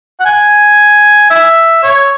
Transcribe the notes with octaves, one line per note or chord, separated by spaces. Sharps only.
F#5
G#5
E5
C#5